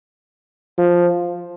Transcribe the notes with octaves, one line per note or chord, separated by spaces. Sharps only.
F3